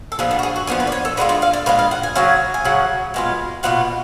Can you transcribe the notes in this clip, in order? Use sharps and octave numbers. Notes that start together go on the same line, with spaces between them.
A4
F3 B3 D4 G#4
A4
F#4
G#4
F#4
F3 B3 D4 G#4
B4
D5
C#5
A4
D3 G#3 D4 F4 B4
D5
F5
D5
D3 G#3 D4 F4 B4
F5
F#5
G#5
C#3 F#3 C#4 F#5
G#5
C#3 F#3 C#4 F#5
B2 G#3 B3 F4
B2 G#3 B3 F4 F#5